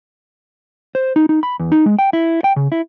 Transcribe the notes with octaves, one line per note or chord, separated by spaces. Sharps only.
C5
D#4
D#4
B5
E2
D#4
G#3
G5
E4
G5
C#3
E4